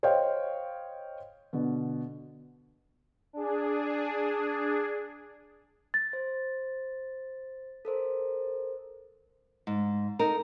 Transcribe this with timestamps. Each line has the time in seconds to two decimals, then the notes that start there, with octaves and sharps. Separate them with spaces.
0.03 C5 C#5 D#5 F5 G5
1.53 B2 D3
3.33 D4 G#4
5.94 A6
6.13 C5
7.85 A4 A#4 C5
9.67 G#2
10.19 D#4 A4 A#4